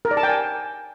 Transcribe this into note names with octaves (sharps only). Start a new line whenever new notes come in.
A#4
D5
A5
G5
G#5